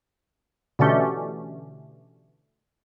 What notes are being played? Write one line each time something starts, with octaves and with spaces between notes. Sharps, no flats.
B2 D3 E3 A3 C#4 G4